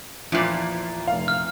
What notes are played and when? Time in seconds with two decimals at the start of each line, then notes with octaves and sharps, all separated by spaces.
0.32 E2 A#2 F3
1.07 F1 F5
1.28 F6